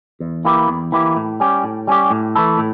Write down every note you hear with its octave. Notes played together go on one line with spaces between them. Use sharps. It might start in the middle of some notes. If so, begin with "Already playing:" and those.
E2
E3 A#3 E4 G4
E2
E3 A#3 E4 G4
A2
G3 C#4 G4
A2
G3 C#4 G4
A2
E3 A3 E4 A4
A2